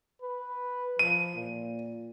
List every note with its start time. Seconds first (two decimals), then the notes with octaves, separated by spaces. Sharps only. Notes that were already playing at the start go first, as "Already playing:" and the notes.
0.22 B4
0.99 F3 D#7
1.35 A#2